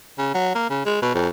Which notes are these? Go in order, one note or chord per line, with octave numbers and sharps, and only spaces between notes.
C#3
F#3
A#3
C#3
G#3
B2
F2